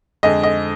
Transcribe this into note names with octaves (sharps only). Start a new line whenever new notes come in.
F2 D3 G#3 D#5
D#5